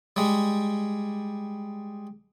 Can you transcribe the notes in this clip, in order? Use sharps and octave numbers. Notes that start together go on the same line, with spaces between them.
G3 G#3